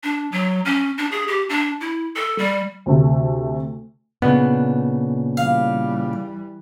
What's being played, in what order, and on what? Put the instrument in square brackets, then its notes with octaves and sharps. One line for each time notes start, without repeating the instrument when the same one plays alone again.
[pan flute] D4
F#3
C#4
D4
G#4
G4
D4
E4
A4
G3
[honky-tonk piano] D2 C3 A3
[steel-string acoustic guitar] A#2 C#3 D4 [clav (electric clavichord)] B3
[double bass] E3 G3 [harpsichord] F5